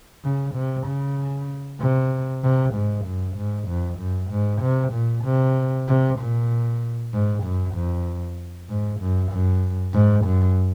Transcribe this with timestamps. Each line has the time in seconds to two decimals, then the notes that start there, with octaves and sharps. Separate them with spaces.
0.24 C#3
0.55 C3
0.86 C#3
1.80 C3
2.43 C3
2.75 G#2
3.05 F#2
3.37 G#2
3.68 F2
3.99 F#2
4.31 G#2
4.62 C3
4.93 A#2
5.24 C3
5.88 C3
6.19 A#2
7.13 G#2
7.44 F#2
7.75 F2
8.69 G#2
9.00 F#2
9.32 F#2
9.94 G#2
10.25 F#2